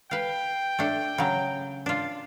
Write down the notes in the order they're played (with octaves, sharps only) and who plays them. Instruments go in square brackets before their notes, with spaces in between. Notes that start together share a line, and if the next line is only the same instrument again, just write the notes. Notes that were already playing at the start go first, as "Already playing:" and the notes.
[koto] B4 F5 [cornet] G5
[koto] A3 D4
C#3 F#3
D4 F4